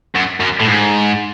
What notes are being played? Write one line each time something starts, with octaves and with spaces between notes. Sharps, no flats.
F#2
F#2
A2
G#2